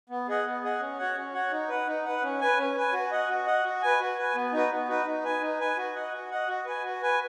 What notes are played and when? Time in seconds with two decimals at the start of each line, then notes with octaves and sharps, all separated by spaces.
0.09 B3
0.28 G#4 D#5 F#5
0.46 B3
0.64 G#4 D#5 F#5
0.80 C#4
0.98 F#4 C#5 F#5
1.16 C#4
1.33 F#4 C#5 F#5
1.52 D#4
1.69 B4 F#5
1.87 D#4
2.05 B4 F#5
2.23 C#4
2.41 B4 G#5
2.58 C#4
2.76 B4 G#5
2.93 F#4
3.11 D#5 F#5
3.29 F#4
3.46 D#5 F#5
3.64 F#4
3.82 B4 G#5
4.00 F#4
4.18 B4 G#5
4.35 B3
4.53 D#4 F#4 B4
4.70 B3
4.88 D#4 F#4 B4
5.06 D#4
5.24 B4 G#5
5.41 D#4
5.59 B4 G#5
5.77 F#4
5.95 D#5 F#5
6.12 F#4
6.31 D#5 F#5
6.48 F#4
6.65 B4 G#5
6.84 F#4
7.02 B4 G#5